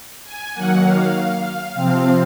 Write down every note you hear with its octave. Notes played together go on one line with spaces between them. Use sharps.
G#5
D#3 F#3 A#3 F#5
F5
C3 F3 C4 F5